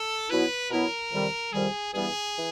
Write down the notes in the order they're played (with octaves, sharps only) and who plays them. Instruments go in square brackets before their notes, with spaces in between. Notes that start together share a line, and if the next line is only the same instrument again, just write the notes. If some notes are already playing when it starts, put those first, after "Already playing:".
Already playing: [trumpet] A4
[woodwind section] B2 F#3 B3 E4 [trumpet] B4
[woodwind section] B2 F#3 B3 E4 [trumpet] A#4
[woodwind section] F2 C3 D#3 G3
[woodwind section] F2 C3 D#3 G3 [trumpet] G#4
[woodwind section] G2 E3 G3 B3 [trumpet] G#4
[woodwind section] E3